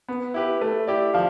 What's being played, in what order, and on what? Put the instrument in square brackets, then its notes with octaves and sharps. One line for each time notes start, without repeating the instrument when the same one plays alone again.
[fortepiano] B3
E4 G4 B4
A3
E4 G4 D5
[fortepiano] F3 [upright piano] F5